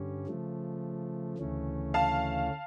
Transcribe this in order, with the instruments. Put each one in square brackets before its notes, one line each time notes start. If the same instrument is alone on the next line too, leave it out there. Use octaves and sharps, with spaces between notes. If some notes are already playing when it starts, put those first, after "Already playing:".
Already playing: [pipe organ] G2 D3 G3 C#4
C#3 F3 A3
D2 C#3 E3 A3 C#4
[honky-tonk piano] F5 A5